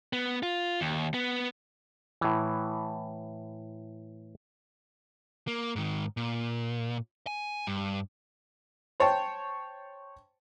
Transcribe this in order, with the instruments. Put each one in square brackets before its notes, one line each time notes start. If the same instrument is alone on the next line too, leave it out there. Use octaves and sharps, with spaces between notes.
[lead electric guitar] B3
F4
D#2
B3
[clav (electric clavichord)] A2 E3
[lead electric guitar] A#3
G#2 D#3
A#2
G#5
G2
[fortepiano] C5 C#5 G5 A5